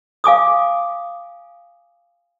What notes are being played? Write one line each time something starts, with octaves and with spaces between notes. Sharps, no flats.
F5 G#5 D6 D#6